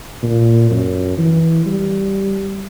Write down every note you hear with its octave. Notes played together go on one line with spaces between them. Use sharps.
A#2
F#2
E3
G3